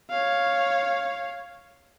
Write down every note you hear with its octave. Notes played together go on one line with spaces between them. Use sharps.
C#5 F5